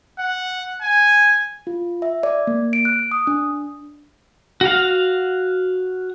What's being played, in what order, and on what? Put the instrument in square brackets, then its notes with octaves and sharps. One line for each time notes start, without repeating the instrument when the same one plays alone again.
[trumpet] F#5
G#5
[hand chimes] F4
E5
D5
A#3
D7
F#6
D#6
D4
[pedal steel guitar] F#4 F5